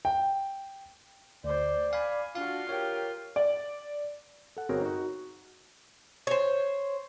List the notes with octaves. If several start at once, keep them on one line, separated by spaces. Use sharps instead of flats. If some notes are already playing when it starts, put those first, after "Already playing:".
G5
D2 C5 D5
F5 G#5 B5
D4 F4 F#4 F5
G4 A#4 C#5 G5
D5
A4 F#5
G1 C4 F#4 G#4 A#4 C#5
D#4 F#4
C5 C#5